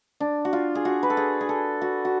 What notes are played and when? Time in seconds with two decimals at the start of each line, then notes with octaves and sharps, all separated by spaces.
0.20 D4
0.45 F#4
0.53 F4
0.75 G#4
0.85 F#4
1.03 B4
1.10 A4
1.17 G#4
1.41 G#4
1.49 A4
1.82 F#4
2.05 F#4